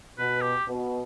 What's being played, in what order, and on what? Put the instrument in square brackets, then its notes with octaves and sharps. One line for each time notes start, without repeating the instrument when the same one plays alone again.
[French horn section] B2 [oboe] B4
[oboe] G4
[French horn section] B2